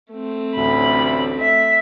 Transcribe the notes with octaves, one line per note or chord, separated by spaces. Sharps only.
A3 C4
A1 D2 A2 B5
E5 B6